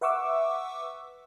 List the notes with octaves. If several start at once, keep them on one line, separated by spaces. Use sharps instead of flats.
B4 E5 F#5 C#6 D6 E6